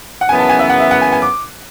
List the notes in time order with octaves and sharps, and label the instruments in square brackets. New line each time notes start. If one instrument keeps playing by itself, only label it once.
[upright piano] F#5
[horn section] F#2 C#3 E3 B3 [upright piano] G#5
[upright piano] A5
G#5
E5
F#5
E5
F#5
G#5
G#5
D6